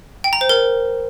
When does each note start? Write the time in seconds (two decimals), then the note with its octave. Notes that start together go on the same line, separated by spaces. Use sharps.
0.24 G5
0.33 A#5
0.41 C5
0.49 A#4